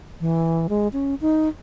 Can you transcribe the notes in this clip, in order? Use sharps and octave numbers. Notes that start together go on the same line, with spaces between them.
E3
G#3
C#4
D#4